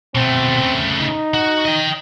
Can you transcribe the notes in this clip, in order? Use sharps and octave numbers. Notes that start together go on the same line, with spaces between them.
B2 A3 C4
C#3 A3
D#4
F#4
D#5 G5